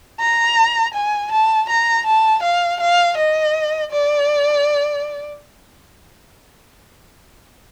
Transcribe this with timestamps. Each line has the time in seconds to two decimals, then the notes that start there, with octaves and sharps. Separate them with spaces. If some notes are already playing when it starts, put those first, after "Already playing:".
0.20 A#5
0.94 G#5
1.32 A5
1.69 A#5
2.06 A5
2.43 F5
2.80 F5
3.17 D#5
3.91 D5